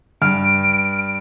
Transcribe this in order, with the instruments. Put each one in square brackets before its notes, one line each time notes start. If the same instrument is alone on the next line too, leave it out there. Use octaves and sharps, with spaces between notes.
[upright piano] G2 [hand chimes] F6 [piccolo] D7